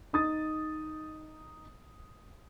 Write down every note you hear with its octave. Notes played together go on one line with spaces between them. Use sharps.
D#4 D#6 A6